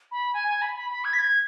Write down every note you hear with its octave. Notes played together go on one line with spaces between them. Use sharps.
B5
G#5
G#5
B5
B5
B5
G#6
B6
G#6